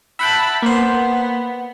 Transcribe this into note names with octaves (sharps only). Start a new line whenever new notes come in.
E5 F#5 G5 A5 B5
A#3 B3 C5